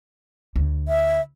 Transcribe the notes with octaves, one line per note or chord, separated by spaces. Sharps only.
D2
E5